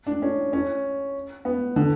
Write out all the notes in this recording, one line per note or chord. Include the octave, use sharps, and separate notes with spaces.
D4
C#4
C#4
B3
D3